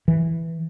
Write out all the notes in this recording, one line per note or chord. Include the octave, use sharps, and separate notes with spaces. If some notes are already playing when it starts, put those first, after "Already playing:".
E3